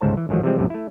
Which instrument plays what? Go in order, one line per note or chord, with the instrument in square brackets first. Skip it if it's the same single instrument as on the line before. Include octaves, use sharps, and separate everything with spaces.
[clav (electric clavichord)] G1 C#2 G#2 C5 A5
E3
A1 G#2 D#3 F3 F#3
C3 E3 F3 G3 G#3 C4
B1 F#2 A2 C3
A3 E4